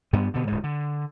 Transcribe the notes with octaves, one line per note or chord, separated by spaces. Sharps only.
G2 G3 B3
B2 D3
D1 G#2
D3